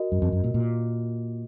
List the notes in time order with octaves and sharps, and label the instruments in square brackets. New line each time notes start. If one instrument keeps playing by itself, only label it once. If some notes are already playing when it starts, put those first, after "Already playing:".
Already playing: [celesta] F#4 A#4 D#5
[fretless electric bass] F#2
F2
F#2
A#2
A#2